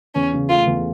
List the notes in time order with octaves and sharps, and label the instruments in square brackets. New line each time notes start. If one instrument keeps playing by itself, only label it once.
[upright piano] E2 [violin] C#4
[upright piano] C#3
[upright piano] A3 [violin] F4
[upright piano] E2